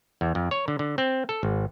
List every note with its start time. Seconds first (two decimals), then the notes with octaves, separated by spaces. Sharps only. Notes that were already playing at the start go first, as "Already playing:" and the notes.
0.21 E2
0.35 F2
0.51 C#5
0.68 D3
0.79 D3
0.98 C4
1.29 A4
1.43 G#1